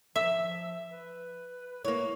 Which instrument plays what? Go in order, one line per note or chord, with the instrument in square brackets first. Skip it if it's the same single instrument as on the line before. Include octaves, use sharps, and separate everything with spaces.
[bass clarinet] F3 [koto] E5
[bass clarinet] B4
[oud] A#3 C#5 [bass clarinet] E4